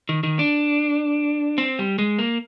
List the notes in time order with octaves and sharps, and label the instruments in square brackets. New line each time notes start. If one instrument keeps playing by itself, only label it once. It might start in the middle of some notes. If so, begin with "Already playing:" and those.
[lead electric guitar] D#3
D#3
D4
C4
G3
G#3
A#3